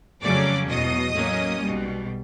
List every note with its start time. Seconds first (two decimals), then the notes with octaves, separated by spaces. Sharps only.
0.21 F2 C#3 F#3 A3 C#4 D5 D6
0.68 E2 B2 F#3 D#5 D#6
1.14 A2 F#3 A#3 C#4
1.61 B1 B2 G3